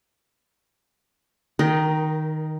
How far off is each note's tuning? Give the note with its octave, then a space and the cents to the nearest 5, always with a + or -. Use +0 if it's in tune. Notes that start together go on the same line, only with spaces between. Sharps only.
D#3 +0 D#4 +0 A#4 +30